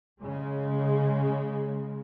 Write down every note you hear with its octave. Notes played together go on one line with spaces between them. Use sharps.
C#3 G#3